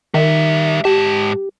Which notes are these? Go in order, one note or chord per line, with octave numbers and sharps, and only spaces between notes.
D#3 G3 E5
G#2 G4 A5